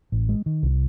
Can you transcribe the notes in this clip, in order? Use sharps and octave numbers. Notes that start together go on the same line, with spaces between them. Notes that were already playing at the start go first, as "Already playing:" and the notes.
A1
G#3
D#3
C2